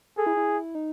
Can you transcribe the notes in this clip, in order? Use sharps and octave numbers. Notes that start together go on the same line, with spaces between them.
G#4 A4
E4
E4
D#4